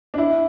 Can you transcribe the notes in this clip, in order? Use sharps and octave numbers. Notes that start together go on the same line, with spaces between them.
D4
E4